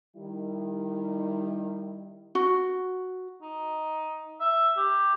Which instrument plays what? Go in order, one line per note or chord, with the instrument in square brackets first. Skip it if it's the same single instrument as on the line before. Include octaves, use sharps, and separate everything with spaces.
[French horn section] D#3 G3 E4
[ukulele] F#4
[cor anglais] D#4
E5
G4